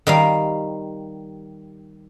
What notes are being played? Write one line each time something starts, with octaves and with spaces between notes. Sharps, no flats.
D#3 G3 F5